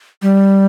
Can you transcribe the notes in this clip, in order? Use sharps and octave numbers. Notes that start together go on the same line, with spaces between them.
G3